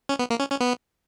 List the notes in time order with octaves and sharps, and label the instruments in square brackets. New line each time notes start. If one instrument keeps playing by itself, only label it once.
[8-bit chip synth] C#4
B3
A#3
C#4
C#4
B3